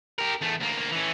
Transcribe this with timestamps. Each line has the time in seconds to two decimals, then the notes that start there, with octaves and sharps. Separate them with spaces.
0.19 G4 A#4
0.42 E2 A3
0.60 D2 A#3
0.91 E3 C#4